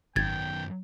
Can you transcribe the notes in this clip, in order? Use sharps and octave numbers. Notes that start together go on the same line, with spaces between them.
G#1 F#2 D#3 G5 G#6 A6